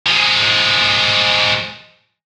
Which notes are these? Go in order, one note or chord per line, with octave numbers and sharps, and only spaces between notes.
F3 G#3